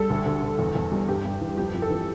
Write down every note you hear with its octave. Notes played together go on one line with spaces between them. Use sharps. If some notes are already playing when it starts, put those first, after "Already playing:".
Already playing: G3 A4
D2
D3
D2
E2
E2
G3
G2 G4
G2
E3
F2 G4
F2
A4
E3